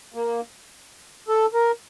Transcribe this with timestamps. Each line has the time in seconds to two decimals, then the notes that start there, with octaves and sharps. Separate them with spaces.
0.14 A#3
1.28 A4
1.54 A#4